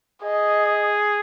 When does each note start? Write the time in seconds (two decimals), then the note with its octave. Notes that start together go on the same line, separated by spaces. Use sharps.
0.23 G#4 D#5